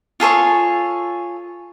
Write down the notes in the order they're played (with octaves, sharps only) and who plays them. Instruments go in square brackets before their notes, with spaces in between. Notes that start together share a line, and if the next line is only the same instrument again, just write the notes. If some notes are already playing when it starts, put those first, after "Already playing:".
[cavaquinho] F4 G#4 A4 C#5